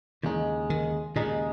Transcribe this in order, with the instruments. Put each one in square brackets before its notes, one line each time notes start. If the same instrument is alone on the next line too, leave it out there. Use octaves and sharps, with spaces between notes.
[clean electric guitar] D#2 C#3 G#3 D#4 [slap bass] E3
[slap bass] D#3
[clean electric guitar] D#2 C#3 G#3 D#4 [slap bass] A#2